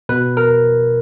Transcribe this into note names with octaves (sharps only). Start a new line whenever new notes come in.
B2 B4
A#4